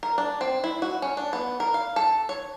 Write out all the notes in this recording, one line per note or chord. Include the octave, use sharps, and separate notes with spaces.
A#4
D4
C4
E4
F#4
C#4
D4
B3
A#4
F5
A4
C#5